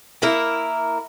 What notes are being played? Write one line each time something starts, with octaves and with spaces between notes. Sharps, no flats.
A#3 E4 A#4